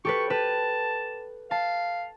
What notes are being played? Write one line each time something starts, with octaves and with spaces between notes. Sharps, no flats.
G4 A4 B4 C#6
B4 A5
F5 A5